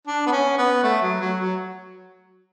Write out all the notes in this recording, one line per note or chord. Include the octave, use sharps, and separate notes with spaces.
D4
B3
C#4
B3
A3
F#3
F#3
F#3